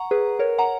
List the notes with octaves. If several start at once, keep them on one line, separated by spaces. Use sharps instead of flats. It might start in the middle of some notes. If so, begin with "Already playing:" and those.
Already playing: F#5 A#5 C#6
G#4 B4
A#4 C#5
F#5 A#5